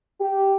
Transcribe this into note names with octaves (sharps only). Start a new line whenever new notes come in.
G4